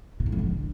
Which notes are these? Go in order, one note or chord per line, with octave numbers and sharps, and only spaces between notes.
B2
A2
F2
D3